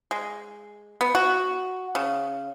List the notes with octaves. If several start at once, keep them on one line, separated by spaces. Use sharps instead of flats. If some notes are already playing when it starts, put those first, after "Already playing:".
G#3
B3
F#4
C#3